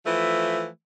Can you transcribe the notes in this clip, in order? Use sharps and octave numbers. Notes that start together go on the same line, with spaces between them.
E3 F3 A3